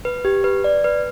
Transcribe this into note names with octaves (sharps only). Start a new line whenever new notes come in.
B4
G4
B4
D5
B4